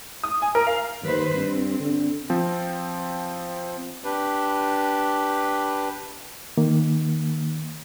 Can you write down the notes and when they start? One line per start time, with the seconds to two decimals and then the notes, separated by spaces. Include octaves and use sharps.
0.24 D#6
0.42 G#5
0.55 A#4
0.67 F5
1.03 D#2 D#3 B4 C5
1.34 G2 C4
1.79 D3
2.30 F3 C4
4.04 D4 G4 B4
6.57 D#3 A#3